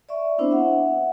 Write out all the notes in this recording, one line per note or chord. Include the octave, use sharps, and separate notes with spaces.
D5 E5 C#6
B3 C4 D4 E4 C5
E5 F#5